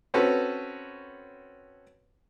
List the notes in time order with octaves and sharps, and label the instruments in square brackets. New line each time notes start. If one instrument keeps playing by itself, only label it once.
[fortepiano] C4 C#4 F#4 A4 B4